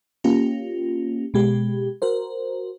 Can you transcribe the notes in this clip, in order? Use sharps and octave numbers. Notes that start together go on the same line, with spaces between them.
A#3 C#4 F4 G4
B2 G#3 G4
F#4 A#4 C5